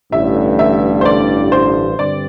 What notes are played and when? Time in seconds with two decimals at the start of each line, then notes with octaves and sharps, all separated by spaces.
0.12 A1 G2 D3 E5
0.59 E5
1.01 C5
1.05 D5
1.52 C5
1.98 G2 D3 C4 D5